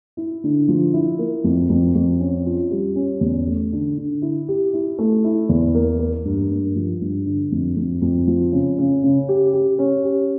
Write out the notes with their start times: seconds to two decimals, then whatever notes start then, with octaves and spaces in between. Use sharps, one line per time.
0.17 E4
0.44 D3
0.68 F3
0.94 E4
1.19 A#3
1.44 F2
1.70 F2
1.95 F2
2.20 C#4
2.46 F4
2.71 G3
2.96 C#4
3.21 E2
3.46 A3
3.72 D3
3.98 D3
4.22 E4
4.48 G4
4.74 E4
4.99 A3
5.24 E4
5.49 E2
5.75 A#3
5.99 A#3
6.25 G2
6.51 G2
6.76 F3
7.01 G2
7.26 D3
7.52 F2
7.77 F2
8.02 F2
8.27 F3
8.52 C#3
8.78 C#3
9.03 C#3
9.29 G4
9.54 G4
9.79 C#4
10.04 G4